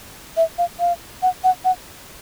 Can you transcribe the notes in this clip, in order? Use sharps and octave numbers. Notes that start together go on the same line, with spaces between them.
E5
F5
F5
F#5
F#5
F#5